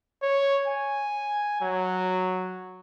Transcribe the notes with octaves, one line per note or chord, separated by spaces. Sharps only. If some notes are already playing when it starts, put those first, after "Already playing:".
C#5
G#5
F#3